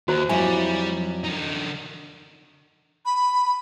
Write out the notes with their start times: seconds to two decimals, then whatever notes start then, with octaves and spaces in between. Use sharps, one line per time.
0.08 D#2 F#4 C5 A#5
0.29 F2 F#3 G3 E4 G#5
1.24 D3 D#4
3.06 B5